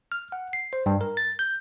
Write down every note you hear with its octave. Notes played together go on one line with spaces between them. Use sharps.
F6
F#5
C7
C5
G2
A#4
A6
G6